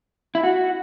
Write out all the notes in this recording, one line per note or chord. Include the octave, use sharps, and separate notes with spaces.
E4
F#4